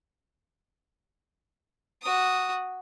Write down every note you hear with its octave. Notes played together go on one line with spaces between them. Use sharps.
F#4 D#6